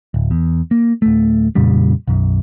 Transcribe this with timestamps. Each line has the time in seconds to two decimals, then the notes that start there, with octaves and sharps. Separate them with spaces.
0.14 D1
0.31 E2
0.71 A#3
1.02 D1 A3
1.55 F2 A#2 C#3 G3
2.08 B1 F#2